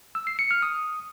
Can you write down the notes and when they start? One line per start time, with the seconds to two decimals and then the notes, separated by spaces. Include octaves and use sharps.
0.15 E6
0.27 C7
0.39 C#7
0.51 F6
0.62 D#6